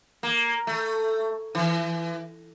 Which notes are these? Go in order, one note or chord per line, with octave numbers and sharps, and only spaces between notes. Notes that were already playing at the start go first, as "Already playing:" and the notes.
A#3
A3
E3